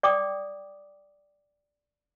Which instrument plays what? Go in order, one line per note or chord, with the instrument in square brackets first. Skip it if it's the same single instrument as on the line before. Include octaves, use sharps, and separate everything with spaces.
[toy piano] D5 G5 D6 D#6